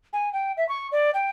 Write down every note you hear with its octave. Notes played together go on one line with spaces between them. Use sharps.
G#5
G5
E5
C#6
D5
G5